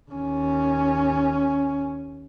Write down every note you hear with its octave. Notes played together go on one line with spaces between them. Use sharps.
D#2 C#4